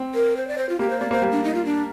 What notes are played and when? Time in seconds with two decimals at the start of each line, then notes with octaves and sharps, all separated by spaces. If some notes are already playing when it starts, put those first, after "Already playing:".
Already playing: C4
0.15 A#4
0.37 C5
0.48 D5
0.58 C5
0.69 F4
0.79 A#3 G4
0.90 C5
1.00 A#3 D5
1.11 A#3 C5
1.22 G3
1.32 D4
1.44 D#4
1.55 F4
1.65 D4